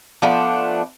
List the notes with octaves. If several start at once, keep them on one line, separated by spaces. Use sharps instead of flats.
F3 A3 B3 D4